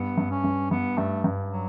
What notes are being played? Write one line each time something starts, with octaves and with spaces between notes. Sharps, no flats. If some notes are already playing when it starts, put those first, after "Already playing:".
Already playing: G2 B3
G2
C#4
G2
G2 B3
G2 A3
G2
F#3